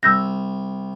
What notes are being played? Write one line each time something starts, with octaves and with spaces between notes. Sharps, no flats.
C2 E6 G6 A#6